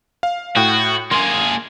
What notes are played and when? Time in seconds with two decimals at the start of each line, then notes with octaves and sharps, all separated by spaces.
0.23 F5
0.56 A2 F#4 G5
1.11 A#3 G#4 C6